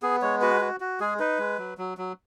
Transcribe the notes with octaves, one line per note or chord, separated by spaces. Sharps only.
B3 G#4
G#3 C#5
F#4 B4
F#4
F#4
G#3 G#4
D#4 B4
G#3
F#3
F#3
F#3